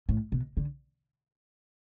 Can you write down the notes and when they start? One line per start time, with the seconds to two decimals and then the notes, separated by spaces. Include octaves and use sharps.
0.09 A2
0.32 B2
0.57 D3